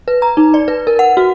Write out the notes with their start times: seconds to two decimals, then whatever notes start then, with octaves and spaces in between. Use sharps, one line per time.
0.08 B4
0.22 A#5
0.37 D#4
0.54 D5
0.68 B4
0.87 A#4
0.99 F#5
1.17 F#4